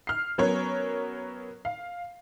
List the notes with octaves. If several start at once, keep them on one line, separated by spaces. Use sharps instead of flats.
F6 C7
F#3 B3 C#4 A#4 C#5
F5